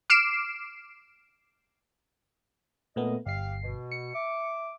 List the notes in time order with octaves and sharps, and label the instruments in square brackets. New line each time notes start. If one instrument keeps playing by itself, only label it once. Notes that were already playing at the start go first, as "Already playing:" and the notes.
[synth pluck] D6 F6 C7 D7 E7
[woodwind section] F#2 D#5 [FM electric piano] A#2 A3 B3
[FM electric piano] G1 C7 [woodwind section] G4 F5
[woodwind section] B2
[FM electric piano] C#7
[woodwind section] E5 D6